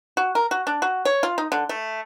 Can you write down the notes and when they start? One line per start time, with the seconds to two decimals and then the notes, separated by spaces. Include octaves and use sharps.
0.17 F#4
0.35 A#4
0.51 F#4
0.67 D4
0.82 F#4
1.05 C#5
1.23 F4
1.38 D#4
1.52 D3
1.69 A3